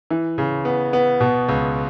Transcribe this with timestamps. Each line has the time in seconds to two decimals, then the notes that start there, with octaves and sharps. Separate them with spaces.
0.11 E3
0.38 C#3
0.65 B3
0.93 B3
1.20 B2
1.48 C#2